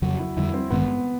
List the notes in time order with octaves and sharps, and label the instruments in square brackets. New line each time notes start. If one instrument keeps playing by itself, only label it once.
[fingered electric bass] F2 C#3 F#3 [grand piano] F#4
[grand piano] E4
[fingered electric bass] F2 D3 G3 [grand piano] E4
[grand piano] C4
[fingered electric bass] A1 G2 D#3 G#3 [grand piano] B3